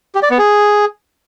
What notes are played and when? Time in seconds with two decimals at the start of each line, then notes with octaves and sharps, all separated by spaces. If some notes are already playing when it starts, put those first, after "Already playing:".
0.15 G4
0.23 D5
0.31 B3
0.38 G#4